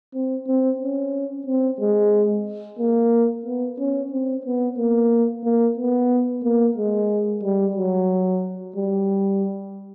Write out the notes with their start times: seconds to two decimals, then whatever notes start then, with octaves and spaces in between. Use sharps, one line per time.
0.14 C4
0.47 C4
0.81 C#4
1.47 C4
1.80 G#3
2.79 A#3
3.46 B3
3.79 C#4
4.12 C4
4.46 B3
4.78 A#3
5.45 A#3
5.78 B3
6.44 A#3
6.78 G#3
7.43 G3
7.76 F#3
8.76 G3